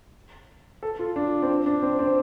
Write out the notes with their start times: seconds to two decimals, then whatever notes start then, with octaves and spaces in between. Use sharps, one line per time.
0.83 A4
0.99 F4
1.16 D4
1.42 C4
1.49 D4
1.66 D4
1.82 C4
1.99 C4